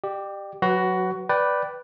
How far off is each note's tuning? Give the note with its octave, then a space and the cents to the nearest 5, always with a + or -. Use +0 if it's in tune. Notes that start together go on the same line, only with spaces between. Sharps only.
G4 +0 D5 +40
F#3 -15 F#4 +15 B4 +0
B4 +0 D5 +0 G5 -20